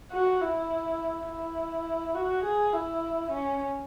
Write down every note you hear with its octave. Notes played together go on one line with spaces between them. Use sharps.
F#4
E4
E4
F#4
G#4
E4
C#4